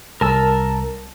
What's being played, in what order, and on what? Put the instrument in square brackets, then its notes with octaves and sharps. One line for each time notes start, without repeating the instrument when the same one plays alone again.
[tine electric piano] C2 [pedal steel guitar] A#4 A5 E6